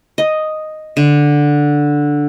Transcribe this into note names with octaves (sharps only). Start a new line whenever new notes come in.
D#5
D3